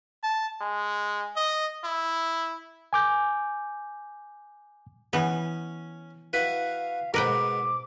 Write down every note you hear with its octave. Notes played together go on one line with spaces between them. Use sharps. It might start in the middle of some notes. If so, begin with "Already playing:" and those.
A5
G#3
D#5
E4
G#5 D6 G6
E3 B3 C#4
E4 F#4 B4 F5
G#2 B2 A#4 B4 G5 D6